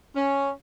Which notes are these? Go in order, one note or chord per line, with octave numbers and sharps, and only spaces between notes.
C#4